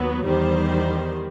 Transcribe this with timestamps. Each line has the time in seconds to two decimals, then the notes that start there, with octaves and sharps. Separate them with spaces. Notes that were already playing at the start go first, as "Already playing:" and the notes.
Already playing: D#2 F#3 B3
0.26 E2 D#3 G3 C5